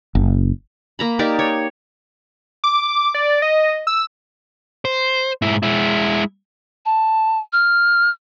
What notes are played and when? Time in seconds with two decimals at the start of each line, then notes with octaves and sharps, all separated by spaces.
0.15 F#1
0.99 A#3 A#5 B5
1.19 D#4 G4 A#4 D5
1.39 C#5
2.64 D6
3.14 D5
3.42 D#5
3.87 E6
4.85 C5
5.42 G#2 E4
5.63 G#3 E4
6.86 A5
7.53 F6